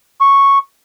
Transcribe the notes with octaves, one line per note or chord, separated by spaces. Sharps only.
C#6